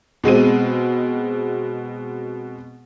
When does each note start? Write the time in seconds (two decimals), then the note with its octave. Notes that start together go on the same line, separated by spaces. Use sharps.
0.24 B2 G#3 C4 D#7